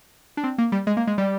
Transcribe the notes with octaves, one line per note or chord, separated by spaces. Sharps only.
D4
C4
A#3
G3
G#3
A#3
G#3
G3